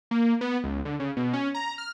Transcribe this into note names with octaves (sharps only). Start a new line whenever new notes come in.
A#3
B3
C#2
D3
C#3
B2
C#4
A#5
F6